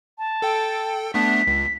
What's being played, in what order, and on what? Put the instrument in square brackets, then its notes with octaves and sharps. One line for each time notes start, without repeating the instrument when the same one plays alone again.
[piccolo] A5
[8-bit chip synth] A4 G5
[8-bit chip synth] A3 B3 D4 [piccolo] B6
[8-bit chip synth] C#2